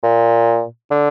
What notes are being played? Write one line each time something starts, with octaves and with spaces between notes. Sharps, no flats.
A#2
D3